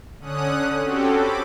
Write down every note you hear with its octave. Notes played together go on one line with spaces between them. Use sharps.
D3 C#4 D#6 F#6
C4 C#4 F#4 G4 A4
B5 D6